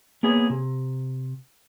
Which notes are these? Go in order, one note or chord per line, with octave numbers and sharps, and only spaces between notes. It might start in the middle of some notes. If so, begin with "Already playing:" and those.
A#3 B3 G#4 C#5
C3